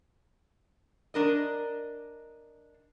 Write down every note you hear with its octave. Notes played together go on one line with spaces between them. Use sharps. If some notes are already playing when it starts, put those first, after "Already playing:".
D4 A#4 D#5